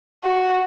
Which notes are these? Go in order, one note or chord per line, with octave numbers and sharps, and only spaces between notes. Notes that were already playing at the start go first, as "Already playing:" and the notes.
F#4